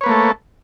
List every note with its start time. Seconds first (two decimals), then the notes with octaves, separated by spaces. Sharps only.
0.01 C#5
0.04 B4
0.06 A#3
0.09 A3
0.12 A4